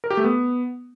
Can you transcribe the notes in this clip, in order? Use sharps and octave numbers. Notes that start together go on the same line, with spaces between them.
A#4
G4
A3
B3